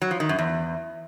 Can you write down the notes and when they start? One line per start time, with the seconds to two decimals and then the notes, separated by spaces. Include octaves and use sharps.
0.02 F#3
0.11 F3
0.20 D#3
0.29 F#2
0.39 E2